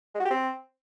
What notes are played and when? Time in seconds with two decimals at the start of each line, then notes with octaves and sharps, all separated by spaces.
0.15 G#3
0.20 F#4
0.25 G4
0.30 C4